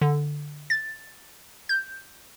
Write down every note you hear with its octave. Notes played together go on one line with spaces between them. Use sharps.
D3
A6
G6